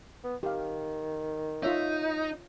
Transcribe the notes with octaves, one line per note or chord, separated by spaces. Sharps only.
B3
D#3 G4 F5
D#4 F4 C#5 E5